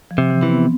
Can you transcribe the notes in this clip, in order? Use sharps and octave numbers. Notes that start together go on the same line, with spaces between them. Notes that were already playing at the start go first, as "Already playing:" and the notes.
F3
C3
E3
E3 C4
B3